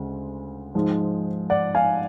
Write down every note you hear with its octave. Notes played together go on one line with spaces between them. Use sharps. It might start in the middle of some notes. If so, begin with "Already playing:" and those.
Already playing: D2 C#3 G#3
G#2 F3 G#3
D5 F#5
F5 G#5